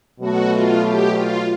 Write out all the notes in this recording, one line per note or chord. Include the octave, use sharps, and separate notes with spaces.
B2 F#3 A3 F#4
F4
G4
F4